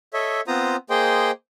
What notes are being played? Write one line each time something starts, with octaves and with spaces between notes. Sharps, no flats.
A4 C#5 D#5 E5
B3 C4 F4 C5 A#5 D#6
A#3 G#4 C5 D#5 G5 C6